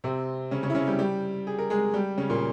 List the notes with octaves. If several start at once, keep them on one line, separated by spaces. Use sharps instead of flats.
C3 C4
C#3 C#4
C#3 C#4
E4
C#3 C#4
G3 G4
G3 G4
G#4
A#4
G#3 G#4
G3 G4
C#3 C#4
A#2 A#3